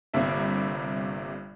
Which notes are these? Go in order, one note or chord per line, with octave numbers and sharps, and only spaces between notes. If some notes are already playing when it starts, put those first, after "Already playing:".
G1 G2 C3 A#3 E5